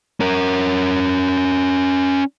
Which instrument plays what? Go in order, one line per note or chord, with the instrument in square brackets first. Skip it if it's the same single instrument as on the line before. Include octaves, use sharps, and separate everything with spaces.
[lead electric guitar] C#4 A#4